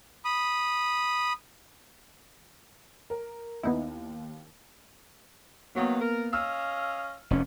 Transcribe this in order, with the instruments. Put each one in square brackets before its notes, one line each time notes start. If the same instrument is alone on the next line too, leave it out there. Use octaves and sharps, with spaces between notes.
[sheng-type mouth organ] B5 D#6
[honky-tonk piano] A#4
[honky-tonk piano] D#2 [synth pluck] B3 D#4 E4
[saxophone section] D#3 F#3 [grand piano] A#3 B3
[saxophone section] A#4
[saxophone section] C#4 D#5 F5 [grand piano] E6 F6
[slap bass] F1 C#4